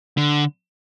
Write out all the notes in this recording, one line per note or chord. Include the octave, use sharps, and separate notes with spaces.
D3